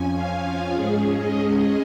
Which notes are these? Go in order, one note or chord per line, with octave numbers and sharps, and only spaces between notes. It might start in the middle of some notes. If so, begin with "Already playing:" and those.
Already playing: F2 F3 C#4 G#5
F5
F4
G#2 G#3 C#4 G#4
D#5